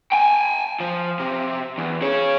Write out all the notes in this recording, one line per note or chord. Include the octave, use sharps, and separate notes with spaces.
G5 G#5
F3
C3
E2
G#4 C#5